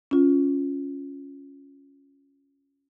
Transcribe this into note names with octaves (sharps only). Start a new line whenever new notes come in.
C#4 F4